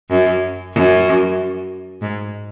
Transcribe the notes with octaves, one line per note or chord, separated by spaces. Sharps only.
F#2
F#2
G#2